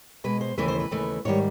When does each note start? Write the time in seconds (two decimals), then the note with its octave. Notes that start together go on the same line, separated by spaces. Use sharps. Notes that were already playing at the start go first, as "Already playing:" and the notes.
0.24 B2 G#3 B4
0.41 C5
0.58 D#2 C#3 E3 A3 B4
0.68 C5
0.80 B4
0.91 D#2 C#3 E3 A3
1.25 G#2 D#3 G3 C#5